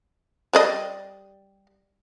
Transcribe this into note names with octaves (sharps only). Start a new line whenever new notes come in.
G3 D5 D#5